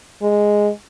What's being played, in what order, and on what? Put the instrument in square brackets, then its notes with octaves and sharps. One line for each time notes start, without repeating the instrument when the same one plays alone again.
[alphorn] G#3